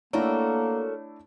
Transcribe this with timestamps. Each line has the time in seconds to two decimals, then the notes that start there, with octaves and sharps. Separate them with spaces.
0.13 A3 A#3 D4 E4 F#4 A4 A#4 C#5